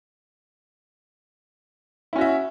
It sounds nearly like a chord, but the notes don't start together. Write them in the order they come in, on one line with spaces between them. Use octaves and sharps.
E4 C#4 F#4 E5